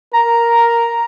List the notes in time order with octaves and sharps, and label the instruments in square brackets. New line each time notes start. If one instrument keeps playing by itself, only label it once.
[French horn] A#4 [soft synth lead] A#5